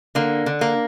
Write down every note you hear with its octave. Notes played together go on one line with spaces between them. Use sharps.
D3 A#3
D3
A#3